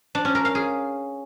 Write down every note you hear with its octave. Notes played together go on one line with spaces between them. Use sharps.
D4
C#4
A#4
F5
G#4